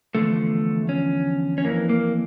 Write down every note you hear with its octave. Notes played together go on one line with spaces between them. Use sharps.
E2 D3 F3 A3
C#4
C#4
F2 E3 A#3
A#3